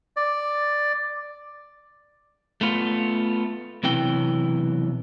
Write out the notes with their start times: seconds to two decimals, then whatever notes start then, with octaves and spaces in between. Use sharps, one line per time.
0.16 D5
2.61 A3 B3 F4
3.83 B1 C3 E3 G5